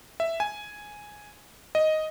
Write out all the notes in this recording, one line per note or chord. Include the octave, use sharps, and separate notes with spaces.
E5
G#5
D#5